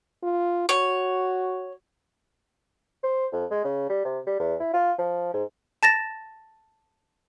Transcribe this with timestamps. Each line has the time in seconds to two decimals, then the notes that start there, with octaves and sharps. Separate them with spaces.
0.23 F4
0.69 F#4 C#5
3.03 C5
3.32 F2
3.51 G#3
3.64 C#3
3.89 G3
4.05 C3
4.27 G3
4.40 E2
4.60 E4
4.74 F4
4.98 F3
5.34 G#2
5.83 A5 A6 A#6 E7